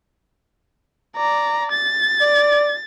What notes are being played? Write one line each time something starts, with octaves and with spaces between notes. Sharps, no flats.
D5 A#5
A6
D5